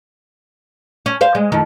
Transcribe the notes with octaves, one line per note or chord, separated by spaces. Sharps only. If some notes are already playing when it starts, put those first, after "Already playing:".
C#4
C5 F5
G#3
F2 D#3